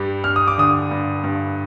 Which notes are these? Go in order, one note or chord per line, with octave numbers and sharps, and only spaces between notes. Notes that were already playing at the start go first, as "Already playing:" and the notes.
Already playing: G2 G3
G2 F6
D#6
D6
D3 D#6
G2
G2